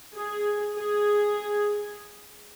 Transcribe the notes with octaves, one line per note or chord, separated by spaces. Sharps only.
G#4
G#4